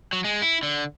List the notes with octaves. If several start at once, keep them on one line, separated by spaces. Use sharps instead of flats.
F#3
G#3
E4
D3